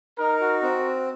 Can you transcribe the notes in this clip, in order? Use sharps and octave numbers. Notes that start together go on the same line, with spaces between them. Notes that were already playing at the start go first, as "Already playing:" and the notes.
D#4 A#4
F#4
C4